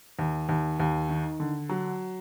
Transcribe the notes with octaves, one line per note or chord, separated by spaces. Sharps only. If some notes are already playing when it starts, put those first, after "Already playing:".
D#2
D#2
D#2
D#3
D3
F#3